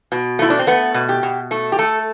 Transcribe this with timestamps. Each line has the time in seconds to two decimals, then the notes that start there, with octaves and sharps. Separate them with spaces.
0.12 B2
0.39 A3 E4
0.50 D4
0.59 C4
0.67 A3 B3
0.94 B2
1.09 G4
1.23 B2
1.51 A3 A4
1.72 G4
1.79 A3 A4